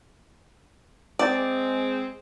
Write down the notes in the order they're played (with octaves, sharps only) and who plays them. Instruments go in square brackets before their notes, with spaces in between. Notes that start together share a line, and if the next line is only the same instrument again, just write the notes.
[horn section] G#3 C4 [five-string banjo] D5